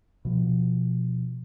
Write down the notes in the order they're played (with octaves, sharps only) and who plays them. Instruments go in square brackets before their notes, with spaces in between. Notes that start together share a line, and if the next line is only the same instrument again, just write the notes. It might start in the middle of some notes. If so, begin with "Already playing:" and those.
[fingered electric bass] B2 F3